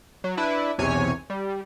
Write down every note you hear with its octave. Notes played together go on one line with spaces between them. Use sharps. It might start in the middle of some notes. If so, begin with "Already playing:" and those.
F#3
D4 E4 B4
B1 E2 C3 C#5 G#5
G3